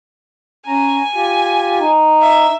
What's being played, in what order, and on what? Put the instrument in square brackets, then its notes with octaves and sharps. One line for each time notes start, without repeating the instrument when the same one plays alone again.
[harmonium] C#4 A#5 [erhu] G#5
[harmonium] F4 G4
D#4
[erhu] E5